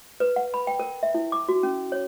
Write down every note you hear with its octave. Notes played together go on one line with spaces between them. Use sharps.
B4
F#5
B5
G5
A#4
E5
E4
D6
F#4
C#4
C#5